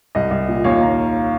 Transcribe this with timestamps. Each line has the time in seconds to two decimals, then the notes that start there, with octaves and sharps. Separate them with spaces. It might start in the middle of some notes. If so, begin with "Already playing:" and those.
0.15 C2 D#5
0.31 C2
0.48 A#2
0.64 D#2 C#5 F5
0.80 A#5